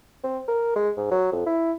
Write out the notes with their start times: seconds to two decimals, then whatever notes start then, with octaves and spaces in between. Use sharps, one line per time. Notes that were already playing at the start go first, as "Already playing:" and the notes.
0.24 C4
0.48 A#4
0.76 G#3
0.97 G#2
1.11 F#3
1.32 F2
1.46 E4